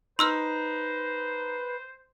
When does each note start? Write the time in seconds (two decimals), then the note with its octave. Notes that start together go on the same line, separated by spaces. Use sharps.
0.19 D#4 B4 C5 C6 E6 F6